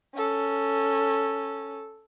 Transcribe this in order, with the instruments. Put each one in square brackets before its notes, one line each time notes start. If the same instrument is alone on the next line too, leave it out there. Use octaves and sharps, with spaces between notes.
[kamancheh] C#4 A4